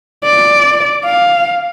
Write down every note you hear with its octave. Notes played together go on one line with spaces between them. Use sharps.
D5
F5